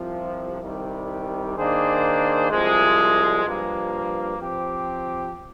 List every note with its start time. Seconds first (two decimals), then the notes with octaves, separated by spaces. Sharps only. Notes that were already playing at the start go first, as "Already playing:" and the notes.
Already playing: C2 C3 F3
0.63 C2 C3 D#3 G3
1.56 D#3 A#3 D4 G#4 C5
2.50 C2 C3 F3 G#3
3.44 G2 F3 A#3
4.38 F3 C4 G4